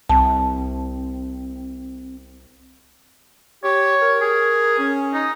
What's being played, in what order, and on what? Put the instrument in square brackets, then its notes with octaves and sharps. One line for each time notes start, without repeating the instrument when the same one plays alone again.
[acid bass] C2 [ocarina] C4 [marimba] A5
[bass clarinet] G4 [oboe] C#5
[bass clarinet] A#4
[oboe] G#4
[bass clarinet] C#4
[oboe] D#4